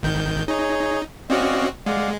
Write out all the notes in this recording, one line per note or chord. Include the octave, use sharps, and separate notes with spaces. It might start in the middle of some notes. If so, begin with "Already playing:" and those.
G#1 D#3 G6
D#4 G#4 C#5
C4 C#4 F#4 D5 D#5 F5
G#3 D5 F5 F#5